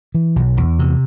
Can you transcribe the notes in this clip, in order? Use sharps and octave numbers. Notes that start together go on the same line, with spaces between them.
E3
B1
E2
C3